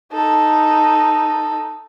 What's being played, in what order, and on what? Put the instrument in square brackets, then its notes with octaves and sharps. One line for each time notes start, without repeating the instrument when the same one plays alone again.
[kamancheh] D#4 A4